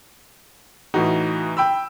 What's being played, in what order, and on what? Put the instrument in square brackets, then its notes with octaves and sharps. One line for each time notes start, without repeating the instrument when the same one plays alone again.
[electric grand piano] A2 E3 D#4 [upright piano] F#4
[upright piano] G5 B5 E6